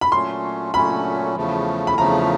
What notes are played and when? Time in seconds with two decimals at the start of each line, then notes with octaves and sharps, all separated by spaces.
0.01 B5
0.12 A#2 F#3 A3 C#4 C6
0.74 A#2 F#3 A3 C#4 B5
1.37 E2 C#3 F3 A3
1.87 B5
1.98 E2 C#3 F3 A3 A#5